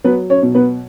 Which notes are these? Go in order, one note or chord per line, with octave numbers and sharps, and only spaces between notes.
F#3 B3 B4
C#4 C#5
B2
B3 B4